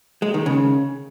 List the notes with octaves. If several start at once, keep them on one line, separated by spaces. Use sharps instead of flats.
G#3
D#3
C#3